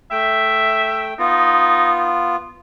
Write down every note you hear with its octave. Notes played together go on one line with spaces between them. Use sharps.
A3 E5 G5
B3 D#4 F4